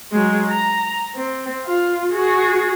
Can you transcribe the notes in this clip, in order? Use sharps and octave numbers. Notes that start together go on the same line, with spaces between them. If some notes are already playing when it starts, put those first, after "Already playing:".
F#3 G#3
A#5
C4
F4
F#4 G#4